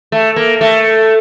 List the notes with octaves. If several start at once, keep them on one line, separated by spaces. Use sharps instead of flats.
A3
A#3
A3